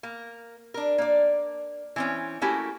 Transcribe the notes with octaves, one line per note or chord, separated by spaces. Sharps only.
A#3
D4 A#4
A#3 D5
E3 C4 C#4
A3 A#3 C#4 E4 F#4 G4